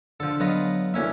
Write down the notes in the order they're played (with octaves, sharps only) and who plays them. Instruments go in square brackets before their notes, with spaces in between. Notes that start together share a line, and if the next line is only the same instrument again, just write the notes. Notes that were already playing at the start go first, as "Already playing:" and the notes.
[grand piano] D3 [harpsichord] F3 A4
[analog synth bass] F#3 [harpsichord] B3 F4 D#5
[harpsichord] D2 C#4 E5 [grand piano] A#3 E4